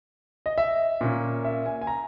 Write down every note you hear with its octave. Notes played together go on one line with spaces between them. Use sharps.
D#5
E5
A#2 A#3 C#4
E5
G#5
G#5
A#5